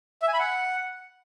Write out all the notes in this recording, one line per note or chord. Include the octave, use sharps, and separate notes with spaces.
E5
G#5
B5
F#5